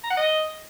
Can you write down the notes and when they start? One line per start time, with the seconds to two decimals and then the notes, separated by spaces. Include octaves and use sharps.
0.04 A#5
0.10 F#5
0.17 D#5